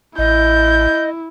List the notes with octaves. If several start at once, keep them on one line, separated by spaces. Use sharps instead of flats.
A1 E4 D#5 G6